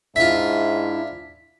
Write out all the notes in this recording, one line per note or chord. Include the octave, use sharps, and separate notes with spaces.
G#2 D4 E4 F4 E5 B6